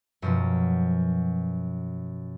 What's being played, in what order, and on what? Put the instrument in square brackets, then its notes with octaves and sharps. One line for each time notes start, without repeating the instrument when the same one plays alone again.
[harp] F#2 B2 F3